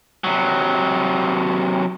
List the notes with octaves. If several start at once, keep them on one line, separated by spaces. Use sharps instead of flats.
C3 F#3